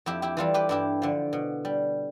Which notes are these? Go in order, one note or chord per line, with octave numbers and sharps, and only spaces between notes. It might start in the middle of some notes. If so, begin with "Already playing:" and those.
F2 E4 G4
E4 G4
E3 G3 F4 A4
G4 B4
G2 E4 G4
D3 F3
B2
G3